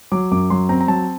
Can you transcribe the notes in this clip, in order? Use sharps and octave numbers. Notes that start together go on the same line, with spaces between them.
F#3 D6
F#2 D6
F#3 C6
C4 A#5
A#5
F#3 A5